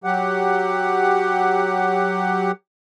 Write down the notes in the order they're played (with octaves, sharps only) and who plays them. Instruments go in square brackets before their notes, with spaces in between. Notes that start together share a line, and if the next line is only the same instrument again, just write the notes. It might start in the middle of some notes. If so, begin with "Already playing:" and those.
[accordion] F#3 G4 F#5